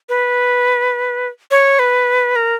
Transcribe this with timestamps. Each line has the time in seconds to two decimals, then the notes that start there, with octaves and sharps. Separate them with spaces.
0.09 B4
1.51 C#5
1.79 B4
2.36 A#4